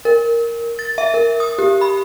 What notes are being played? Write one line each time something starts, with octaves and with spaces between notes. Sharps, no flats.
A#4
A6
E5
A#4
D#6
G4
B5